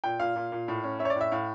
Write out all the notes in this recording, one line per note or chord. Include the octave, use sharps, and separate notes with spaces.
A#2 G5
A#2 F5
A#2
A#2
A2
C#4
C#4 E5
C#5
D5
A2
E5
A2 F5